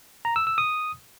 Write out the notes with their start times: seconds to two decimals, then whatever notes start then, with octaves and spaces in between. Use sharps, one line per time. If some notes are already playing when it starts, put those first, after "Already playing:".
0.25 A#5
0.36 E6
0.47 E6
0.58 D#6